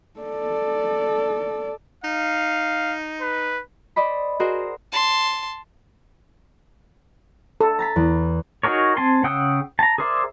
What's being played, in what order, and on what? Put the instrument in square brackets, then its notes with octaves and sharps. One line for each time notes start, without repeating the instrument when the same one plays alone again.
[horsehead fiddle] A4 D5
[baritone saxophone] D#4 [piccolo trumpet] F5
[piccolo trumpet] B4
[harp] C5 D5 D#5 B5
F#4 G#4 A#4 C5 D#5 C6
[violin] A5 C6
[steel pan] A4
[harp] A#5 A6 B6
E2
[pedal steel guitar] D#4 F#4 G#4 A#4 C#5
C4 G#5 A5 C6
C#3 F#5 G5 D#6 E6
A5 A#5
G#4 A#4 C5 D5 E5